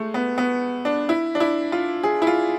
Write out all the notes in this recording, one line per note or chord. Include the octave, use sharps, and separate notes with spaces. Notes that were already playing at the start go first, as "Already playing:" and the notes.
Already playing: G#3 A3
B3
B3
D4
E4
D4
E4
F4
G#4
E4
F4